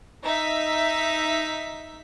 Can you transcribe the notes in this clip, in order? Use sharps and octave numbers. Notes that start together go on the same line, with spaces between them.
D#4 E5 B6